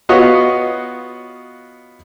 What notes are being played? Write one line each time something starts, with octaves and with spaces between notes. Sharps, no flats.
B3 F4 F#4 C#5 D#5